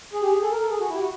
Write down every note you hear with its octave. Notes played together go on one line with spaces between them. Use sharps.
G#4
G4
G#4
A4
A#4
A4
G#4
F#4
E4
G4
F#4